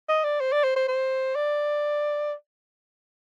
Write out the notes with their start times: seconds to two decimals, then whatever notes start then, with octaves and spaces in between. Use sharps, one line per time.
0.09 D#5
0.24 D5
0.41 C5
0.52 D5
0.64 C5
0.76 C5
0.88 C5
1.36 D5